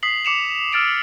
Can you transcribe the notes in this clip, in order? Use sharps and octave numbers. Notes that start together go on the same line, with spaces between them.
D#6 B6 C7 F#7
D6 C#7 E7 F7
E6 F6 A6 D7 E7